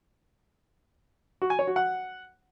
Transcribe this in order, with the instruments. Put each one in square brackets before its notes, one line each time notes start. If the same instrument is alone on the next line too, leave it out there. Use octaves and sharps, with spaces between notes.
[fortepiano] F#4
G#5
C#5
F#4
F#5